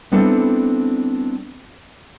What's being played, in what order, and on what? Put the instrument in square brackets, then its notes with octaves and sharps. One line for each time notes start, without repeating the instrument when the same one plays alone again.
[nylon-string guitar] G3 B3 C4 D4 E4 A4